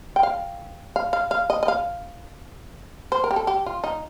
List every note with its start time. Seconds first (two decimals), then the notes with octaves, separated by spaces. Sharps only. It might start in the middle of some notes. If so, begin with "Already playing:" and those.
0.16 G5
0.23 F5
0.96 F5
1.13 F5
1.31 F5
1.50 D#5
1.63 D#5
1.68 F5
3.12 C5
3.24 A#4
3.31 G4
3.36 A4
3.47 G4
3.66 F4
3.84 D#4